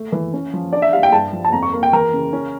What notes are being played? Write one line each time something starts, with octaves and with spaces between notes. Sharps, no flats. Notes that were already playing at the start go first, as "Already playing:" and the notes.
Already playing: A3
E3
C#4
F3
D4 D5
E5
G3 F5
G5
G2 A5
F3
A5
F2 A#5
C#6
A#3
G5
E3 A#4
C#3
C#4